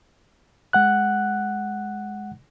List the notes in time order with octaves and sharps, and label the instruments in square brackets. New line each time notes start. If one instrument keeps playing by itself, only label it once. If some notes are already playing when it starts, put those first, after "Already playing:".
[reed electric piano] G#3 F#5 F#6